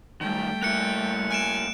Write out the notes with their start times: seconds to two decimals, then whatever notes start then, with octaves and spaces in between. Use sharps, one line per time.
0.21 F#2 D#3 G3 A3 G5
0.63 A#3 E4 F#6 C#7
1.31 G#5 F#6 D7 E7